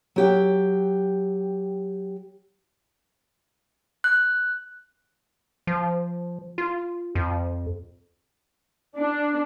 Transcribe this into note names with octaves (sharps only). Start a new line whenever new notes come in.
F#3 G4 G5
F#6
F3
F4
F2
D4